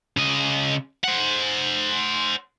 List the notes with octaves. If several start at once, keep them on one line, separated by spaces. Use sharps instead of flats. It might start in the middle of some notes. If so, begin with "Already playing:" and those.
C#3 D#5
C5 F#5